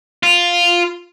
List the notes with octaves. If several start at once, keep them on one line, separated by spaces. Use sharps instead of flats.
F4